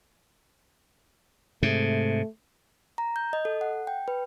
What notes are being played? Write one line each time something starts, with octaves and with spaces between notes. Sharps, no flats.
G#2 C3 A3
A#5
G6
D#5
A4
F#5
G5
B4